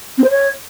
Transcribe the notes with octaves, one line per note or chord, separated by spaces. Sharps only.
C4
C5
C#5